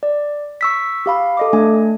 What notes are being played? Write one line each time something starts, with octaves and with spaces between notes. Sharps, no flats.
D5
C#6 E6 B6
G4 F5 B5
A4 D#5 D6
A3 D4 G#5